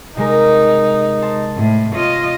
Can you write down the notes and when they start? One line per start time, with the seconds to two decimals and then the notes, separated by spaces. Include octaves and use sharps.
0.17 C3 G#3 D#4 A#4
1.22 C5 A5
1.57 A2
1.95 F4 C#5 D#5